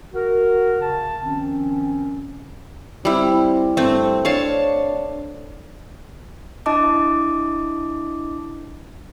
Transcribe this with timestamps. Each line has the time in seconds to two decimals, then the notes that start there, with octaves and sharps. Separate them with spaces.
0.14 F#4 A#4
0.80 C#3 A5
1.22 D#3 F3 C4 C#4
3.05 G3 C4 E4
3.77 G2 A3 C4
4.25 D4 C#5 F5 A5
6.66 D4 E4 D#5 A5 D6